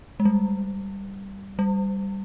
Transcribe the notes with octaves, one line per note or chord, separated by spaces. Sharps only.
G#3
G3
G3